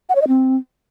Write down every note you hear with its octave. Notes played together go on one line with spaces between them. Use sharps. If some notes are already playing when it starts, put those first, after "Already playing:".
F#5
C#5
D#5
C4